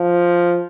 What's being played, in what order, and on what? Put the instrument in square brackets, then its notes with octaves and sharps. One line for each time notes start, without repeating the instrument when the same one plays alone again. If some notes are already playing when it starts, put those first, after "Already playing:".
Already playing: [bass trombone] F3